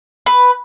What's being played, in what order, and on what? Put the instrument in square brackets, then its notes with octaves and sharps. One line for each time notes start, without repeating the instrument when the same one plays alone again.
[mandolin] B4